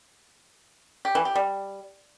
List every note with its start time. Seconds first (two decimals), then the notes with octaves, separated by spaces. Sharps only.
1.05 G4
1.15 E3
1.25 G4
1.35 G3